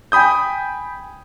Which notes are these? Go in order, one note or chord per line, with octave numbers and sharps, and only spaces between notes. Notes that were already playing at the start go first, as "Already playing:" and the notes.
G5 G#5 B5 D#6 G6